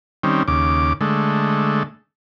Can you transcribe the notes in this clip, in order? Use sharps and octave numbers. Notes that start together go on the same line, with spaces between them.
D#3 G3 C4 C#4
D#2 C#3 D6
D3 G#3 A3